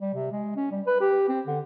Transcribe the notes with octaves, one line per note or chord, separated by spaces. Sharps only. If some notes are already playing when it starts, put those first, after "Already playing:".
G3
C3
G#3
C#4
G3
B4
G4
C4
D3